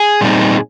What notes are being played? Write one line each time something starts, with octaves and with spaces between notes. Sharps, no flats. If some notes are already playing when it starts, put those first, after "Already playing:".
Already playing: G#4
A#2 G3 C4 D#4